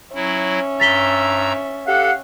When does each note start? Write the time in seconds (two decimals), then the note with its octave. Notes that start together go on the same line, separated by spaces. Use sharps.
0.15 F#3 C#4 E4 E5
0.80 G2 A#5 E6 A6 B6 G7
1.87 G4 A4 F5 F#5